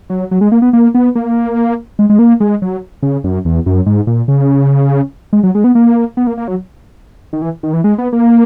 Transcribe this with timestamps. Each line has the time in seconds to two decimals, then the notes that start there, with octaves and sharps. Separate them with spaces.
0.10 F#3
0.31 F#3
0.41 G#3
0.52 A#3
0.62 B3
0.73 A#3
0.94 B3
1.15 A#3
1.99 G#3
2.10 G#3
2.19 A#3
2.40 G#3
2.62 F#3
3.02 C#3
3.24 F#2
3.45 E2
3.66 F#2
3.86 G#2
4.07 A#2
4.28 C#3
5.33 G#3
5.43 F#3
5.55 G#3
5.64 B3
5.75 A#3
6.17 B3
6.27 A#3
6.37 A#3
6.48 F#3
7.33 D#3
7.42 E3
7.63 D#3
7.73 E3
7.84 G#3
7.98 B3
8.13 A#3